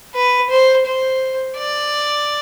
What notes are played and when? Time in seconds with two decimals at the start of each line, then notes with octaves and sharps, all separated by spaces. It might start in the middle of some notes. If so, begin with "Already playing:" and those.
0.14 B4
0.50 C5
0.86 C5
1.57 D5